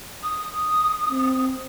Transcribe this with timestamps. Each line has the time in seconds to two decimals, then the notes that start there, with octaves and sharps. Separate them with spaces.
0.23 D#6
1.10 C4